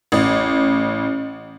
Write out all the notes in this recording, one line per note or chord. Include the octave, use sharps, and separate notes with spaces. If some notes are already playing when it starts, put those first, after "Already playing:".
A1